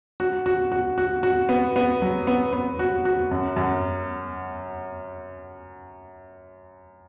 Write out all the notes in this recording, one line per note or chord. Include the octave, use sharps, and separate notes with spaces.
F#4
F#4
F#4
F#4
F#4
B3
B3
F#3
B3
B3
F#4
F#4
F#2
F#2